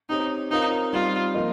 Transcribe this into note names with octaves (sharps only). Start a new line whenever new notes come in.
C4 D#4 G4 C#5
C4 D#4 F4 A#4 C#5 F5
G3 C4 D#4 F4
F3 A#3 F4 A#4 D#5